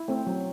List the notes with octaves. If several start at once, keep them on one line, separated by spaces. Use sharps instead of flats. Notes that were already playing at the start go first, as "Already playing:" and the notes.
Already playing: E4
A3 C4
F#3